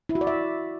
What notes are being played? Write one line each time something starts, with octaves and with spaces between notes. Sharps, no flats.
E4
F#4
D5
E5